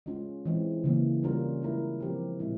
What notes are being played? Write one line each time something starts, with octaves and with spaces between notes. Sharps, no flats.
G#3 C#4 F4
E3 G#3 C4
C#3 E3 A#3
G3 C#4 F4 A#4
G#3 E4 A#4
F3 C4 G4 A#4
A#2 G#3 C4 E4